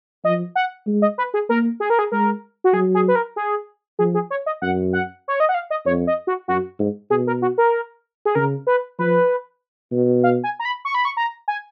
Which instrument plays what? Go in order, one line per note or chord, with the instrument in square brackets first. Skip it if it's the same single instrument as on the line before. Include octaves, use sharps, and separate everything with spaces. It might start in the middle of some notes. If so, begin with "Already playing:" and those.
[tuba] F3 [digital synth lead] D#5
[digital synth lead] F#5
[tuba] G#3
[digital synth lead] D#5
B4
G#4
[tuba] A#3 [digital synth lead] A#4
[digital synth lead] G#4
A#4
G#4
[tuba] G#3 [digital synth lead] A#4
[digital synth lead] F#4
[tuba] F#3 [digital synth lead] G#4
[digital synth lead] G#4
B4
A#4
G#4
[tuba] F3 [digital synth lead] G#4
[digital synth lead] G#4
C#5
D#5
[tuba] F#2 [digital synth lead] F#5
[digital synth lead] F#5
C#5
D#5
F#5
F5
D#5
[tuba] F2 [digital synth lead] C#5
[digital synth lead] D#5
F#4
[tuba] F#2 [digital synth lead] F#4
[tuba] G#2
[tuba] B2 [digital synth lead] G#4
[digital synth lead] A#4
F#4
A#4
G#4
[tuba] C#3 [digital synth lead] A#4
[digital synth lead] B4
[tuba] F3 [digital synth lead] B4
[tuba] B2
[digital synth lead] F5
G#5
A#5
B5
C#6
B5
C#6
A#5
G#5